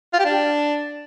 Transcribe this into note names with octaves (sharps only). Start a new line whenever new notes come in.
F4
G4
D4